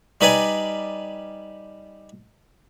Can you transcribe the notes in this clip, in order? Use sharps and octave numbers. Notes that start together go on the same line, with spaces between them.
G3 D#4 B4 D5 G#5